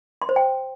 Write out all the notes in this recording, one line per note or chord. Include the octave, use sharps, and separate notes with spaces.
C6
C5
G5